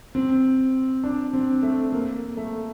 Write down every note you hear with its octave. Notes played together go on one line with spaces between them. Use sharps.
C4
D4
C4
A3
A#3
A3